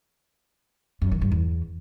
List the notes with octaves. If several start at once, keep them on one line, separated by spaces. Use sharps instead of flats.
F#2
D#3
G2
E2